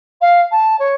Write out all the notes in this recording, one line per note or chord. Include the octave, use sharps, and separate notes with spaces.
F5
A5
C#5